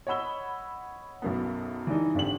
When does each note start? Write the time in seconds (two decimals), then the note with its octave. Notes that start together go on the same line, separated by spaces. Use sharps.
0.07 C#5 D#5 F#5 B5 E6 G7
1.22 B1 F#2 B3
1.87 E3 G3 D4 D#4
2.15 G#1 D3 G4 F#7